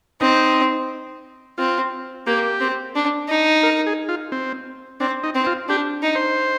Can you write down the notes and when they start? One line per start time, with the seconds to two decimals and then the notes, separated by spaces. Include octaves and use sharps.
0.21 C4 D#4
1.58 C4 F4
2.27 A#3 G4
2.61 C4
2.96 D4
3.29 D#4
3.63 A#4
3.87 G#4
4.09 F4
4.32 C4
5.00 C4 D4
5.23 D#4
5.35 C4
5.47 F4
5.69 D4 G4
6.03 D#4
6.15 C5